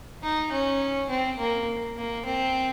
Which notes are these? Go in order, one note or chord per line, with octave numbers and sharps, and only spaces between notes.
D#4
C#4
C4
A#3
A#3
C4